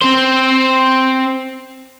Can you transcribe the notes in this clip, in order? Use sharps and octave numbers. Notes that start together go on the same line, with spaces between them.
C4 C5